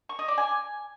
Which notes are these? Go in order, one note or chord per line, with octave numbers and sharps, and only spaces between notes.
C#6
D#5
D5
G#5